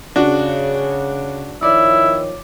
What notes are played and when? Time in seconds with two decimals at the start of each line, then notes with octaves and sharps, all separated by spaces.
0.16 C#3 D4 F#4
1.63 D#3 F3 E4 C#5 D5